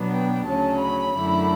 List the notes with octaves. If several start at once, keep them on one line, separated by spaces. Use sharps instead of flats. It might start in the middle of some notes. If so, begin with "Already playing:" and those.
Already playing: B2 F#3 B3 D4
G5
D2 C#3 F#3 C#4 A5
B5
F#2 D3 A3 E4